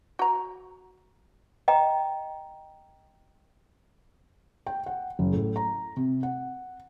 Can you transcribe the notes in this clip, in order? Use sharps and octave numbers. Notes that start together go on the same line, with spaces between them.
F#4 A#5
D#5 G5 A#5
G5
F#5
F#1
A2
A#5
C3
F#5